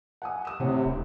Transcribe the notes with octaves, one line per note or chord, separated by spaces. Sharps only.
F#5 G#5 D#6
D#6 E7
A2 C3 C#5 F#5
D1